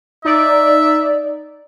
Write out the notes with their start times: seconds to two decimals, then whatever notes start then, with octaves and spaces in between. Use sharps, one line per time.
0.25 D#4 D5 E5